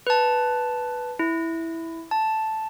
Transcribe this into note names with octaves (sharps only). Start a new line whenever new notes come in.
B4 A5
E4
A5